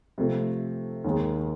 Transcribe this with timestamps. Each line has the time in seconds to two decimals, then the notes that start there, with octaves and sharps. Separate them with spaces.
0.18 C3 F3 A3
1.04 D#2 D#3 G#3